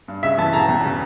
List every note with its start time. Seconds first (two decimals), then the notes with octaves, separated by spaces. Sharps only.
0.08 G2
0.23 C#3 E5
0.38 E3 A5
0.53 E1 A#5
0.68 E2
0.83 C#3